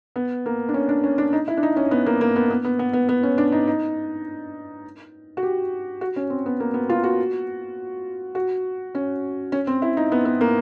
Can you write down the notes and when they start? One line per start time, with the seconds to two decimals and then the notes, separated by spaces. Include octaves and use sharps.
0.16 B3
0.46 A#3
0.68 D4
0.74 C#4
0.89 D4
1.03 C#4
1.18 D4
1.33 D#4
1.48 E4
1.57 D4
1.63 D#4
1.76 C#4
1.91 B3
2.06 A#3
2.21 A#3
2.36 B3
2.50 B3
2.65 B3
2.79 B3
2.93 B3
3.09 B3
3.23 C#4
3.38 D4
3.52 D#4
3.67 D#4
5.37 F#4
5.43 G4
6.01 F#4
6.16 C#4
6.30 C4
6.46 B3
6.60 A#3
6.74 B3
6.89 F4
7.03 F#4
8.35 F#4
8.95 C#4
9.52 C#4
9.67 C4
9.82 E4
9.97 D#4
10.12 B3
10.25 B3
10.41 A#3